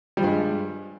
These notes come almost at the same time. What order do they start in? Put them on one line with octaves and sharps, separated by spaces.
G3 F3 G2 G#3